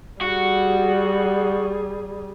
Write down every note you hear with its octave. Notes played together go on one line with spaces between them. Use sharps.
G3 F#4 G#4